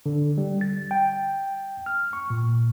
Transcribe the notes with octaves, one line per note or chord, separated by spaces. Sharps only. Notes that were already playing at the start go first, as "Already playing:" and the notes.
D3
G3
A6
G5
F6
C#6
A#2